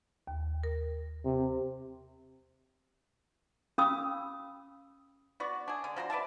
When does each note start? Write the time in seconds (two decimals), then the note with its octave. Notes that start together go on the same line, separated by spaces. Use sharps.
0.27 D#2
0.63 A#4
1.25 C3
3.78 C#4 F5 B5 D#6 E6
5.40 B3 F#4 D5
5.68 D4 G#4
5.84 D3
5.96 F3 F#4 A#5 C6
6.10 B4 D5 E5 A5